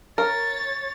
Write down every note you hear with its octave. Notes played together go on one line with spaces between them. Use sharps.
A#4 C#5 A6